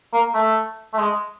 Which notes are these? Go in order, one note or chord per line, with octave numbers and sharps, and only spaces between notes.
A#3
A3
A3
G#3